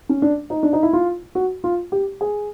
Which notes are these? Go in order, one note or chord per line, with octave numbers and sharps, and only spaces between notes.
C#4
D4
D#4
D4
D#4
E4
F4
F#4
F4
G4
G#4